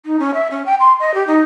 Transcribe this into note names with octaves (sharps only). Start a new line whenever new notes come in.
D#4
C#4
E5
C#4
G5
C6
D#5
G4
D#4